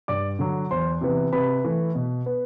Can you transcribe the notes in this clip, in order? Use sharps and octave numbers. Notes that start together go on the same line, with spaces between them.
G2 D5 D6
D3 F#3
E2 C5 C6
C3 E3 B3
C3 B4 B5
E3 A3
B2
B3